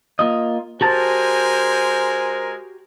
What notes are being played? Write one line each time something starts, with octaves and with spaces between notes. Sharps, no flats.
A#3 F4 D#5
G#3 F#4 G4 A#4 C5 G#5 A5